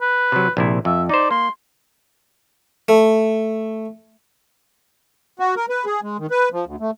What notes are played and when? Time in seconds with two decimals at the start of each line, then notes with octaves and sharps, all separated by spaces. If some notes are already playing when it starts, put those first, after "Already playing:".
0.01 B4
0.32 C3 F#3
0.57 A#1 C3 E4
0.85 F2 E5
1.09 D#4 C5 D5
1.31 A#3 C6
2.88 A3
5.39 F#4
5.56 A#4
5.69 B4
5.85 G#4
6.03 G#3
6.19 D#3
6.31 B4
6.52 F3
6.66 D2
6.80 A3